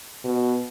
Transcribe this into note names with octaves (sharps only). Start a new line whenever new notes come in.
B2